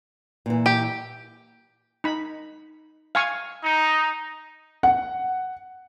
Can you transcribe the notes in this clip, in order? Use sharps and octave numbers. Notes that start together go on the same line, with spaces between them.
A#2 E3
G4
D#4 B5
F5 G#5 C#6
D#4
F#5